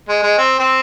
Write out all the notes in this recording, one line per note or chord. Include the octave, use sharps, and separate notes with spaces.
G#3
G#3
C4
C4